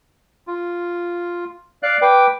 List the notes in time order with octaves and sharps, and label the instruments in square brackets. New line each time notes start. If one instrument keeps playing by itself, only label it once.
[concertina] F4
[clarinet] D5 [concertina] F5 F#6
[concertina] B4 D6 [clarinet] G5